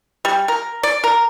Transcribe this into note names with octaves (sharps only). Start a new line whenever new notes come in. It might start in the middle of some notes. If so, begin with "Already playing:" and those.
G3
A#4
D5
A#4